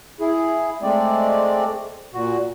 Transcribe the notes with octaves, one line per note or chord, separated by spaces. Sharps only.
E4 G#4
G#3 A3 C4 D5
A#2 F#4